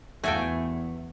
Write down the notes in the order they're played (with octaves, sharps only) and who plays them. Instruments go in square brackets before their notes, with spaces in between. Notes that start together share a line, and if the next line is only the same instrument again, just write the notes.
[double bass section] E2 [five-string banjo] A3 [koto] F#4 A4 G5 [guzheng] G#5